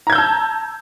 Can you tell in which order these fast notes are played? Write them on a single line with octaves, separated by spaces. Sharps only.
A#5 G#6 G6 E6 A5